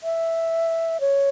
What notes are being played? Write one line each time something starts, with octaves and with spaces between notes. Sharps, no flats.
E5
C#5